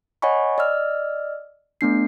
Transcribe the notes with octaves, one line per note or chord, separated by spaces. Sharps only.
C#5 D#5 F#5 G#5 B5 C#6
D5 D#5 E6 F6
A3 B3 D4 C7